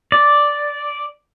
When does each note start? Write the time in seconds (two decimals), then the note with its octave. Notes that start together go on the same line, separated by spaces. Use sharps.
0.12 D5